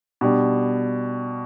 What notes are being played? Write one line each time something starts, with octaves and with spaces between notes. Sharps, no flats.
B2 G3 D4